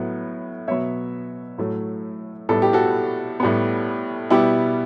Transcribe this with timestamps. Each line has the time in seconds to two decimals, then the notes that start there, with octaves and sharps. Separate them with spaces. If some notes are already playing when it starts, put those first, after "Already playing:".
Already playing: A2 F#3 B3
0.68 B2 F#3 B3 C#5 E5
1.58 A2 F#3 A3
2.49 A2 G3 B3 A4
2.62 G4
2.73 F#4 A4
3.40 A2 G3 B3
4.30 B2 G3 B3 E4 G4